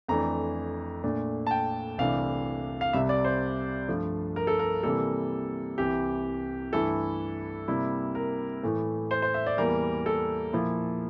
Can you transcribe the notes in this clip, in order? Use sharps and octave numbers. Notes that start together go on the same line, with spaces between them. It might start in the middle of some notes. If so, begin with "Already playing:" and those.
F2 E3 A3 D4 A#5
A#2 A3 D4
A5
G5
C2 C3 E3 A3 D4 F5
F5
C2 C3 G3 E5
D5
C5
G2 F3 A3
A#4
A4
A#4
C3 E3 G3 A#3 A4
C2 C3 E3 G4
G2 E3 A3 E4 A4
C3 G3 A#3 E4
A#4
A2 E3 A3
C5
C5
E5
D5
E2 E3 G3 A#3 A#4
A4
A#2 F3 A#3 E4